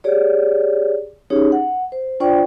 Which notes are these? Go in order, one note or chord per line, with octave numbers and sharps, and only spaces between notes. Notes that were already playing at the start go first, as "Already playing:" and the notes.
G4 G#4 C#5 D5
C#4 D#4 G4 G#4 C#5
F#5
C5
D4 F4 C5 D5 G5 C#6